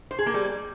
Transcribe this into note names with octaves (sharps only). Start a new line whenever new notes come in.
C5
G#4
A#3
G3